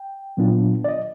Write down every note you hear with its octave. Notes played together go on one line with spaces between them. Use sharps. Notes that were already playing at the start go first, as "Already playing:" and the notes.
Already playing: G5
A#2 F#3 B3 D4 F4
D5
D#5